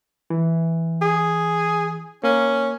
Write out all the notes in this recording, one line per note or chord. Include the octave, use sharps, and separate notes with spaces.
E3
G#4
A#3 C#4